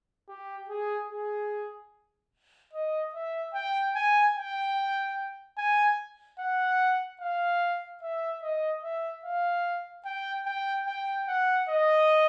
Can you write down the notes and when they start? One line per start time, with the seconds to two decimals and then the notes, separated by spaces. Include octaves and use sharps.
0.28 G4
0.69 G#4
1.10 G#4
2.73 D#5
3.14 E5
3.54 G5
3.95 G#5
4.35 G5
5.58 G#5
6.39 F#5
7.21 F5
8.03 E5
8.42 D#5
8.83 E5
9.25 F5
10.05 G5
10.46 G5
10.87 G5
11.28 F#5
11.69 D#5